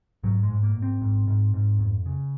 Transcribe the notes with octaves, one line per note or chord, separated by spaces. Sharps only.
G#2 F#3
G#3
G#2
A#3
G#2
C4
G#2
G#2
G#2
F2
C#3